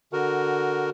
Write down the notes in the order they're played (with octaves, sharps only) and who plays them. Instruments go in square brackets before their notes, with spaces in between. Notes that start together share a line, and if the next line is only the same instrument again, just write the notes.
[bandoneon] D3 F#4 A#4